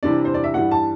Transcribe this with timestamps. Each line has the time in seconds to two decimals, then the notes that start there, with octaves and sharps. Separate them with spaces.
0.03 C3 E3 G3 D4 D5
0.25 C5
0.34 D5
0.44 E5
0.54 G2 E3 G3 F#5
0.71 A5